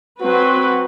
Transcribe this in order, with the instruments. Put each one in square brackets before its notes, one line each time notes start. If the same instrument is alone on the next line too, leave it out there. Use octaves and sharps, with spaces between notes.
[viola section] F#3 C4 B4 [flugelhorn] F#4